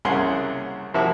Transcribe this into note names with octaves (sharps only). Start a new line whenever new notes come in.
C2 C#3 A#3 G#4 F#5 C6
C3 F3 A#3 E4 F#4